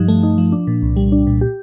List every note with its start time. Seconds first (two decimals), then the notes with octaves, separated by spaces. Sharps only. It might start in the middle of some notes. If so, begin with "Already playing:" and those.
Already playing: G2 F3 D#4
0.08 A3
0.23 D#4
0.38 F3
0.52 D4
0.67 A#2
0.82 C2
0.96 G3
1.12 D4
1.27 A#2
1.41 G4